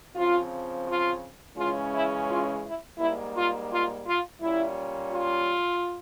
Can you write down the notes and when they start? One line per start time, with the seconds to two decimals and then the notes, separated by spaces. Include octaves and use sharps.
0.15 C#3 F3 C4 F4
0.86 F4
1.57 C#3 E3 G#3 C#4 F4
1.92 E4
2.28 F4
2.64 E4
2.98 G#2 G3 A#3 E4
3.35 F4
3.70 F4
4.04 F4
4.41 A#2 G3 C#4 E4
5.11 F4